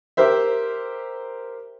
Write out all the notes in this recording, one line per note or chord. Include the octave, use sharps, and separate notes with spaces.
G4 A#4 C5 E5